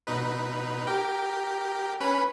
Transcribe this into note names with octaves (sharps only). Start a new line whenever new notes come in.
B2 D#4 B4
G4 A#4 G5
C#4 B4 B5